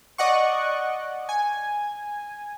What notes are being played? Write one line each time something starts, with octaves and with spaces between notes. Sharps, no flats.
D5 D#5 F#5 C#6
G#5